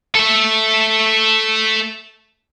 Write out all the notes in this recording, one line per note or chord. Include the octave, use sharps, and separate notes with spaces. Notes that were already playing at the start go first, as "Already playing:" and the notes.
A4 E5